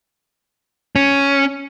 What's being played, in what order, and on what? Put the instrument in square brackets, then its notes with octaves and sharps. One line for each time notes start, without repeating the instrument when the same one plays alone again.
[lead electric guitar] C#4